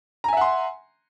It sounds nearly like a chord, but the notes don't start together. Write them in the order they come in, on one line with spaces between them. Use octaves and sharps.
A#5 G#5 E5 F#5 C6